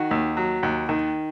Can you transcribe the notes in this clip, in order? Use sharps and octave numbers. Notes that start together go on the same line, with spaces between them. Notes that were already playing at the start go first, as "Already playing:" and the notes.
Already playing: D#3 F#4
D#2
F#3
D#2
D#3